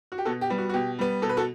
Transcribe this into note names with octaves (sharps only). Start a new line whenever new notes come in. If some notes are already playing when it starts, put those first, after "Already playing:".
F#4
G4
B2 F#4 A4
G4
G3 B3
F#4
F#4
B2 G4
G3 B3
B2 A4
B4
F#4 A4